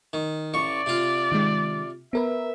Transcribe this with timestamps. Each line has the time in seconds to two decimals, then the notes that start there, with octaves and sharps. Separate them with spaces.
0.13 D#3
0.54 A1 D5 C#6
0.86 C3 F4
1.32 D#3 G#3
2.13 B3 A#4 B4 E5